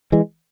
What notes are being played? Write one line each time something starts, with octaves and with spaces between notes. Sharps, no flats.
E3 G#3